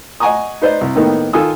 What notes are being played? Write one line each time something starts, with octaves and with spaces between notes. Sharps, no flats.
D#5 F#5 G#5 A#5 C#6 D#6
D#4 B4 C5 D5 D#5
C2
A2 D#3 A#3 B3 D#4 G5
D#3 F4 A4 G#5 D#6 E6